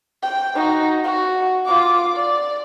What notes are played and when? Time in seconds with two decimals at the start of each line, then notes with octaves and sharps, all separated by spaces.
0.22 G5
0.55 D#4 F#4
1.04 F#4
1.65 F4 D6
2.16 D5